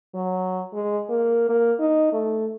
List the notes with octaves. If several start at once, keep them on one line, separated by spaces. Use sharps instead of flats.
F#3
G#3
A#3
A#3
D#4
A3